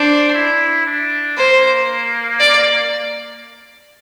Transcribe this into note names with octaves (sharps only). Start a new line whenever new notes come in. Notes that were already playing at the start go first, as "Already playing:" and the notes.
Already playing: D4 C5
E4
D4
A#3 C5
D5